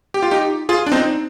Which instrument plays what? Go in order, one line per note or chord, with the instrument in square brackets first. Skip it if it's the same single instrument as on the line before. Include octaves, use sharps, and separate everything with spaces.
[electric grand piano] G4
F4
D#4 G4
F4 G#4
D4
C4 D#4